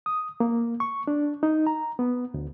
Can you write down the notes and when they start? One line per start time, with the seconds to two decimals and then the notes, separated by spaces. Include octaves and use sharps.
0.06 D#6
0.40 A#3
0.80 C#6
1.07 D4
1.43 D#4
1.67 A#5
1.99 B3
2.34 D2